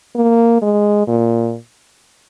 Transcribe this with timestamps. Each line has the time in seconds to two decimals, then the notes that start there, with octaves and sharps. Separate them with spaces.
0.15 A#3
0.62 G#3
1.07 A#2